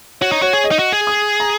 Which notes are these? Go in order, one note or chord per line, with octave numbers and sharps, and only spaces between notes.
F#4 C#5
D#4
F#4 C#5
G#4
D#5
D#4
F#4
G#4
D#6
A#5